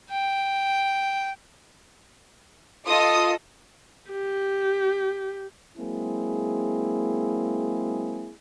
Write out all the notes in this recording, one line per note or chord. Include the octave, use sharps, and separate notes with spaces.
G5
F4 A4 D#5 D#6
G4
F#3 G#3 A#3 C4 E4 G#4